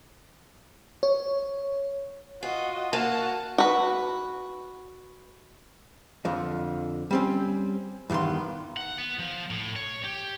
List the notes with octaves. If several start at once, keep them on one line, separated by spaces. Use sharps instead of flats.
C#5
F4 F#4 D#5
A#3 F#4 F#5 A5
F#4 B4
F2 D3 F3 D#5
G3 C4 C#4
E2 G2 D#3 B3 C6
F#5
B3
F3
A2
C#5
G4